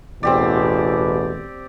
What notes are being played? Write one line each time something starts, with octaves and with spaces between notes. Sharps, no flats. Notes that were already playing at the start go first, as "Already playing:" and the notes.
A1 E2 B2 C4 G4 D5